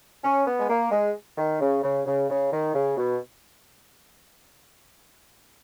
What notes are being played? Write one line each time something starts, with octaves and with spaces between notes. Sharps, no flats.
C#4
B3
G#3
A#3
G#3
D#3
C#3
C#3
C#3
C#3
D#3
C#3
B2